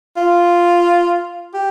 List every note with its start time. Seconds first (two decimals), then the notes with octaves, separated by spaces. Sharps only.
0.17 F4
1.54 G4